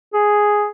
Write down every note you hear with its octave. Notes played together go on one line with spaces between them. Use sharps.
G#4